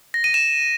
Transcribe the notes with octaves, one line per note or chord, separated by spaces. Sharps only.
A#6
D#7
E7